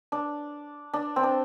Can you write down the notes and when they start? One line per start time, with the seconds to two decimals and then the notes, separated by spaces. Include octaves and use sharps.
0.12 D4
0.94 D4
1.16 C4
1.23 D4